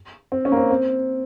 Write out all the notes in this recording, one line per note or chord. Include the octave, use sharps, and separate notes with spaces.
C4
C#4
A#3
C4
C4